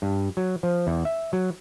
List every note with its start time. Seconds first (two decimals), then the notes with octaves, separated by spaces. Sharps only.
0.02 G2
0.37 F#3
0.63 F3
0.87 E2
1.05 E5
1.33 F#3